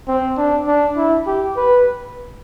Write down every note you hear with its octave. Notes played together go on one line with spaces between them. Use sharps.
C4
D4
D4
E4
G4
B4